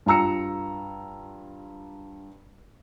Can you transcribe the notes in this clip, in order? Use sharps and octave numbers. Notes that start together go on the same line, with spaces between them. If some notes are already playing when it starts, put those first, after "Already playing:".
G2 F4 A#5 E6 C#7